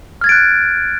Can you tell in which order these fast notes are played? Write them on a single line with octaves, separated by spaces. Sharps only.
F6 G#6 A6 D7 F#6